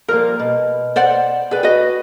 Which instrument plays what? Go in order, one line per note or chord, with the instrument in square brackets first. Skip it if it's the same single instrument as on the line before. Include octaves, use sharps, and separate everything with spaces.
[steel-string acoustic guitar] F3 G3 A#3 [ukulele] A#4
[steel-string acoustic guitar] B2
[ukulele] C5 D5 F#5
[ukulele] G#4 B4 [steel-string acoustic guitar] D5 G5
[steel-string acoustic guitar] F#4 [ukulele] B4 D#5